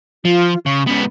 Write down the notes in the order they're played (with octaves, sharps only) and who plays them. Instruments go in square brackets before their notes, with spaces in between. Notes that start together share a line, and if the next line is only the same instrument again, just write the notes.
[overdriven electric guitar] F3 [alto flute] F4
[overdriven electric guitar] C#3 [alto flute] C#6
[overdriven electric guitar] G#2 B3 [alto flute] C#4